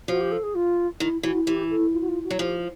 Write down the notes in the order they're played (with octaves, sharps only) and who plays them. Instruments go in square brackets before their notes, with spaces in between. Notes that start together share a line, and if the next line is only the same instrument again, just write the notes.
[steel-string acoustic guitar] F3 [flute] F#4
[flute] G4
A4
G#4
F4
[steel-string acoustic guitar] D#3 [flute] E4
[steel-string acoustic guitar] E3 [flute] F#4
[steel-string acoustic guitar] E3 [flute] G4
[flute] A4
F4
F#4
F4
F#4
[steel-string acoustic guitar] F#3
[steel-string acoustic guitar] F3 [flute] G4